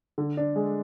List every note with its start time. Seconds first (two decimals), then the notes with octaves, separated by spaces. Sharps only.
0.18 D3
0.37 D4
0.56 G#3